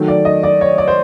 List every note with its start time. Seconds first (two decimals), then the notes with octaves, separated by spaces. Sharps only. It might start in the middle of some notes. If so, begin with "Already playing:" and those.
Already playing: D#3 F#3 A3
0.08 D5
0.25 D#5
0.43 D5
0.61 C#5
0.78 D5
0.88 C5